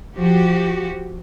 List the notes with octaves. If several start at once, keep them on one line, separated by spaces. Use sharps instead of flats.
F3 F#4 G4